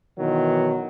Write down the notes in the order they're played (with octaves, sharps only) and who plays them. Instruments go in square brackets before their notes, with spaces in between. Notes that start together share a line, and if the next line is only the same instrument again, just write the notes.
[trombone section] B2 D#3 E3 F#3